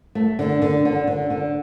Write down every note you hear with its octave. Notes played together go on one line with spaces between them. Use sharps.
A3
D3
D3
D3
D3
D3